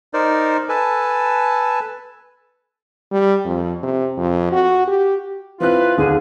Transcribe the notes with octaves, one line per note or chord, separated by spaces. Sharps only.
D#4 A#4 C5 D5
A4 B4 G#5 A5
G3
F2
C3
F2
F#4
G4
E3 C4 F4 B4 F#6
D#2 D3 G#4